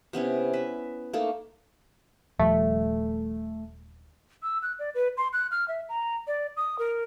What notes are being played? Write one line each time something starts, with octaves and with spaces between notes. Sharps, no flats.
C3 B3 C#4 E4
B4 E5
A3 A#3 D#4 A4
D#1 F3 G3 A3
E6
F#6
D5
B4
C6
F#6
F6
E5
A#5
D5
D#6
A#4